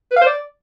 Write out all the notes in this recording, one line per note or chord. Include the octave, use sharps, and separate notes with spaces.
B4
F5
C5
D5